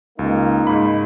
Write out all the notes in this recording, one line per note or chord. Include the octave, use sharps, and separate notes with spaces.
C#2 A#3 D#4
G#2 B5